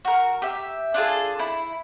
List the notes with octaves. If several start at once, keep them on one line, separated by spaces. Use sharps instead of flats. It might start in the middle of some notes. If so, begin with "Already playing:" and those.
F#4 A#4
G4 E5
D4 F4 G#4 A4
E4 B5